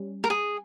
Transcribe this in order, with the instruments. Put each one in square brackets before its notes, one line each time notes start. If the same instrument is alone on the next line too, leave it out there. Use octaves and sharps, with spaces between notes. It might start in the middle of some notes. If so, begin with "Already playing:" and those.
Already playing: [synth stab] G3 C#4
[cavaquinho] A#4
G#4